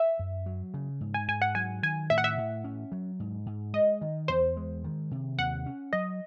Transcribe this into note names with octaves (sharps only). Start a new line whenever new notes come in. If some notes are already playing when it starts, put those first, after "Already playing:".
Already playing: E5
F#2
F#3
C#3
G#2
G#5
G#2 G#5
F#5
F#3 G#5
D#3 G#5
A2 E5
F#5
E5
A2
C#4
F#3
G#2
G#2
G#3 D#5
D#3
E2 C5
G#3
D#3
C3
D#2 F#5
C#4
F#3 D#5